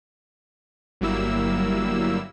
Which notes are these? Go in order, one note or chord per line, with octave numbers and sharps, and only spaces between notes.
G1 F#3 G3 A#3 E4 E6